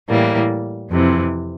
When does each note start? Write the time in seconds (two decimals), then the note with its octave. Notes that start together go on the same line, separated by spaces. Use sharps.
0.08 A2 E3 G3 A#3
0.90 F2 C3 E3